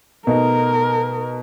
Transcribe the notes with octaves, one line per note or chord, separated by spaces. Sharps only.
B2 A3 D#4 A#4